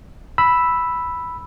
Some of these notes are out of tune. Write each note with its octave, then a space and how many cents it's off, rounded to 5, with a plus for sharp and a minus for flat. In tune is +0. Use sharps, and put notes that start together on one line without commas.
B5 +0 E6 +0